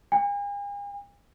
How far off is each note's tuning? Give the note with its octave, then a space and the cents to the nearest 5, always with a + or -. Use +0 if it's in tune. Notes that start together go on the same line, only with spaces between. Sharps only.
G#5 -45